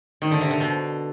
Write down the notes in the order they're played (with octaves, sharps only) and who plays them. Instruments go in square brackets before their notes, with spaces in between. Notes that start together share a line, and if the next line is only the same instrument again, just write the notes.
[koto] D#3
D3
C3
D3
B2